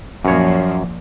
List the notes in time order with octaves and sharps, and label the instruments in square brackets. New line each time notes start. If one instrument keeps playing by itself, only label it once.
[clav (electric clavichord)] F#2 C#5 [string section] A#2 F3